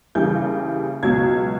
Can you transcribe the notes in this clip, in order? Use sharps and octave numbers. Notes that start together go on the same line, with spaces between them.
D#2 C#3 E3 G3 G6
C#2 B2 F#3 G#6